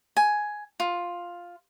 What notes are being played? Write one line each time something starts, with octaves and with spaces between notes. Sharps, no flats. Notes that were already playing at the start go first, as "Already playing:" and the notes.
G#5
F4